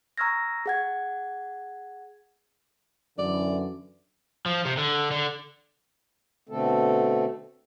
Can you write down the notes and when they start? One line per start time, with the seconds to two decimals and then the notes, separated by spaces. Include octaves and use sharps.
0.18 A#5 C#6 E6 F6 G#6 A#6
0.66 G#4 F#5 G#6
3.19 F#2 D3 E3 D5
4.46 F3
4.65 C3
4.77 D3
5.11 D3
6.49 B2 D3 A3 C4 A4